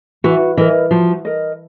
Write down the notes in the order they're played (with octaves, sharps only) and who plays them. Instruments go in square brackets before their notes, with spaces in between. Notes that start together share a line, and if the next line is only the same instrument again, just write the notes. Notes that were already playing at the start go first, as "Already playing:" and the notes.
[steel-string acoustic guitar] E3 [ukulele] F#4
[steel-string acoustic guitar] E3 [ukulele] A#4 D#5
[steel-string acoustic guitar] F3 [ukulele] F#4
[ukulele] A#4 D#5